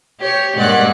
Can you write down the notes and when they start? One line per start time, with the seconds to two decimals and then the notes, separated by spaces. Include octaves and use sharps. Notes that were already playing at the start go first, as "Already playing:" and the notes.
0.20 G4 C#5
0.57 G2 A#2 G#3 D5 F#5 F#6